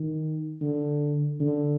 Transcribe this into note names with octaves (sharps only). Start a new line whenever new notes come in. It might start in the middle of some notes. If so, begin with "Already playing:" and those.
Already playing: D#3
D3
D3